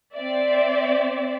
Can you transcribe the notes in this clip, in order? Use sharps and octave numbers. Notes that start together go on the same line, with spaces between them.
C4 D5 E5